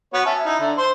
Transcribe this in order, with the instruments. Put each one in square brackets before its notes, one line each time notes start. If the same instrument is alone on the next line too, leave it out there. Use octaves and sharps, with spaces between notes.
[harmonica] B3 F#4 C#5
C#4 E5 A5
D#4 E4
D3
C5 C6